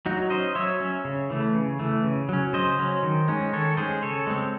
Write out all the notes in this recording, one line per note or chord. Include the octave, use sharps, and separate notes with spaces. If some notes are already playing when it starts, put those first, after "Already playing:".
F#3 D#4 F#4
C#4 C5 D#5
F#3 C#5 E5
C#4
C#3
E3 A3
C#3
E3 A3
C#3
F#3 C#4
C#3 C5 D#5
F#3 C#4
D#3
G#3 C#4
D#3 A4 C#5
G#3 C#4 G#4 C5
C#3 A4 C#5
G#3 C4